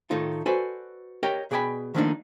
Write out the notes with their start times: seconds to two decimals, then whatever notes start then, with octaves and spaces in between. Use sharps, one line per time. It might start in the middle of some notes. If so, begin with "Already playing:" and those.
0.10 A2 D#3 A3 D#4 F4
0.46 F#4 A4 B4 C5 D5 G#5
1.23 G4 A#4 C#5 D#5 G5
1.51 B2 G#4 D5 G5 G#5 B5
1.94 D#3 F3 A3 A#3 D4 D#4